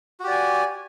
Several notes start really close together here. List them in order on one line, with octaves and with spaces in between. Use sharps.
F#4 G4 D5 G#5